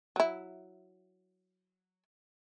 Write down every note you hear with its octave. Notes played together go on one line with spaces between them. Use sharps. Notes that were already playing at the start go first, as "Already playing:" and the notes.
F#3 E4